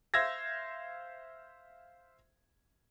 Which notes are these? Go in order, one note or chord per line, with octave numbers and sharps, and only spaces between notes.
C5 E5 F5 E6 G#6 A#6